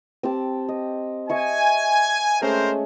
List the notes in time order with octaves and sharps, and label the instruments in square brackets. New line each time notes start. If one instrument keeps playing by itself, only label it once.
[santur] C4 G4 A5
D#5
[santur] D#5 E5 C#6 [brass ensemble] G#5
[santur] G#3 A3 C#4 [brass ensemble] C4 A#4 C5